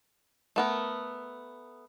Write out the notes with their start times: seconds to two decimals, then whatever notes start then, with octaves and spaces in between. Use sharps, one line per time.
0.56 A3 B3 A#4